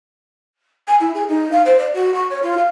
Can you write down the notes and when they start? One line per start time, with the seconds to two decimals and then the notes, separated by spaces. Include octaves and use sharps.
0.88 G#5
1.00 E4
1.15 G#4
1.29 D#4
1.52 F5
1.66 C5
1.78 D5
1.94 F#4
2.14 C#6
2.30 C#5
2.43 F4
2.57 F5